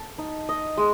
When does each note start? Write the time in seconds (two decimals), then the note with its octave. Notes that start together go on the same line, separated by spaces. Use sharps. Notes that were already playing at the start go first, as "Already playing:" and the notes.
Already playing: A4
0.18 D#4
0.49 D#5
0.77 G#3